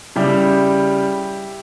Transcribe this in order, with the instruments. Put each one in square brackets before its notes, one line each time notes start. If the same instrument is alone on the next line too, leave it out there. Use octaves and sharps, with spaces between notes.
[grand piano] C#3 G3 E4 G4